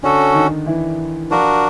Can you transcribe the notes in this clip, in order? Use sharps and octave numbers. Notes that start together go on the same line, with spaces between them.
D3 C#4 D4 F#4 A4
D#3 D#4
E3 E4
F3 D4 F4 F#4 A#4